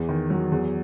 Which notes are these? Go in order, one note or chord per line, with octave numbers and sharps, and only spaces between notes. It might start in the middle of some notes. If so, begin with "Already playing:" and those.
Already playing: E2 E3
D#3
F#3
E2